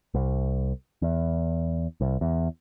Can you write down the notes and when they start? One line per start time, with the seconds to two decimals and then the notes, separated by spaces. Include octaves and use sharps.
0.14 C2
1.02 E2
2.01 C2
2.21 E2